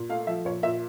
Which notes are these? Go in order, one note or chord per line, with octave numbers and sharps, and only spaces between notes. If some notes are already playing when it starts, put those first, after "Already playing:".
Already playing: A#2
A3 F5
F3 E5
A#2 C#5
A#2 E5